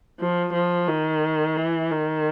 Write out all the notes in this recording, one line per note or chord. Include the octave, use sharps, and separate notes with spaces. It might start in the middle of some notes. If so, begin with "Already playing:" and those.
F3
F3
D#3
E3
D#3